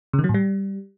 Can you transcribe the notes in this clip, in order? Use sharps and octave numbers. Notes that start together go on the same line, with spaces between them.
C#3
D#3
F#3
A2
G3